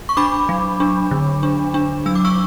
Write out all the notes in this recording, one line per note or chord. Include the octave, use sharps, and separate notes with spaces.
C#6
D4 B5 D6
F#3
D4
D3
D4
D4
F#3 E6
D6
C#6 E6